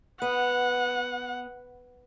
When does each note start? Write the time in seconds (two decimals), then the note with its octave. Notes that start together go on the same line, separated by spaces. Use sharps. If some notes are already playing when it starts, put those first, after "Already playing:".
0.22 B3 F#5